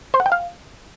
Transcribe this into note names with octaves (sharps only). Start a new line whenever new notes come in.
C5
F#5
G5
F5